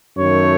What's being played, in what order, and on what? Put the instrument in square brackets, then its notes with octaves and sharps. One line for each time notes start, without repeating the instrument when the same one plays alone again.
[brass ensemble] F#2 D#3 A3 C#5